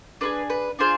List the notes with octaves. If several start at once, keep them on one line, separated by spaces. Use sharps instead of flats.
D4 F4 G#4 B4
B4
D4 F4 G#4 C5